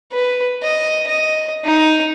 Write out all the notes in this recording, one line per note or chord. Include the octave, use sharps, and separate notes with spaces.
B4
D#5
D#5
D#4